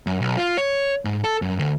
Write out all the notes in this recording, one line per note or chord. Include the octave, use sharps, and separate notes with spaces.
F#2
B1
F4
C#5
G#2
A4
F#2
D2